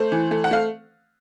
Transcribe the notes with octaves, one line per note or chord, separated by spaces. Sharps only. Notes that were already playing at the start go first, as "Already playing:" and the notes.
Already playing: A3 C5
E3
A3
F#5
A3 F5